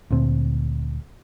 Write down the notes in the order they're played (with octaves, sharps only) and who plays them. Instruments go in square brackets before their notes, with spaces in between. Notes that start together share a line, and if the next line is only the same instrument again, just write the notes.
[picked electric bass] D2 A#2 C4